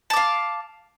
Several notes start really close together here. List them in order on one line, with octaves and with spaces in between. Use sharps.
A5 D6 F5